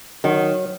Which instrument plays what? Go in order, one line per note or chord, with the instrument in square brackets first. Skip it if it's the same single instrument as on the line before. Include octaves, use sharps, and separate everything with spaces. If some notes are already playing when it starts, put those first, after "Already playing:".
[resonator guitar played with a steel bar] D#3 [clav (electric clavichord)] F#3